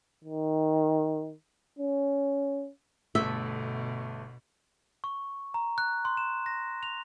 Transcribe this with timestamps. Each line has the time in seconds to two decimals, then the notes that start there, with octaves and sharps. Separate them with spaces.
0.24 D#3
1.79 C#4
3.15 G1 B2 A3 A4 E5
5.04 C#6
5.54 A#5
5.78 F#6
6.05 C6
6.17 E7
6.46 A#6
6.83 F7